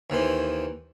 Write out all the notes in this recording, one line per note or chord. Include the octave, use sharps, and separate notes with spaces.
D#2 D#3 E3 C5